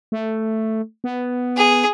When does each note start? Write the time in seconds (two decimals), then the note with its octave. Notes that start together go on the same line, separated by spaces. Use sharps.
0.12 A3
1.04 B3
1.57 G#4